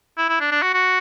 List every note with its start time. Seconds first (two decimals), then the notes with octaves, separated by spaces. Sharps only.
0.18 E4
0.29 E4
0.40 D4
0.51 D4
0.63 F#4
0.74 F#4